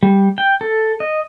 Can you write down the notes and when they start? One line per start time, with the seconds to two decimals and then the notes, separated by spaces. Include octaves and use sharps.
0.03 G3
0.38 G5
0.61 A4
1.00 D#5